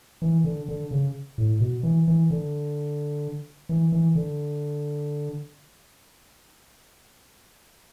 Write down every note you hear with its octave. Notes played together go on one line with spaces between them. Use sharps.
E3
D3
D3
C#3
A2
B2
E3
E3
D3
E3
E3
D3